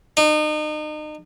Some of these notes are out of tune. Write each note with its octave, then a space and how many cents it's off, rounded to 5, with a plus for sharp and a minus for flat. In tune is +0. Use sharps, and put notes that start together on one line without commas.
D#4 -35